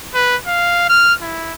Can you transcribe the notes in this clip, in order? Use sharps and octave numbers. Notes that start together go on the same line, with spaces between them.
B4
F5
F6
E4